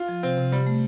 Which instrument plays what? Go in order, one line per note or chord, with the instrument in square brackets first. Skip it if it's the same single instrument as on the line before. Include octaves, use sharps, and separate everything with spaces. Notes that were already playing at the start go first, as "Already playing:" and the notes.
Already playing: [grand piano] F4
[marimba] F3
[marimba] C3 [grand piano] C4
[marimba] C3
[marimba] C3 [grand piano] G3
[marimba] A3